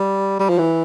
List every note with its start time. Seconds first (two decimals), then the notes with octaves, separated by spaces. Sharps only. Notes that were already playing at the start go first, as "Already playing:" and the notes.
Already playing: G3
0.39 G3
0.49 F3
0.58 E3